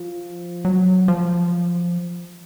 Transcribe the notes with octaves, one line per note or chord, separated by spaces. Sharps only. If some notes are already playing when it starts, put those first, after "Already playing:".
Already playing: F3
F#3
F3